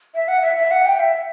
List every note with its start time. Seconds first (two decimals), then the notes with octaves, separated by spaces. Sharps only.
0.14 E5
0.28 F#5
0.42 E5
0.57 E5
0.71 F#5
0.86 G5
1.00 E5